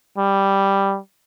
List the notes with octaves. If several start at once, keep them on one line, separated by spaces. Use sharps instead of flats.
G3